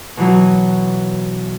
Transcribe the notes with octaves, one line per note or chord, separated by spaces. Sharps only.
B2 E3 F#3